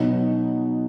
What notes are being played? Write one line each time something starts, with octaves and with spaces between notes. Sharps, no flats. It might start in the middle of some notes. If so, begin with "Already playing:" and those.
Already playing: B2 F#3 B3 D#4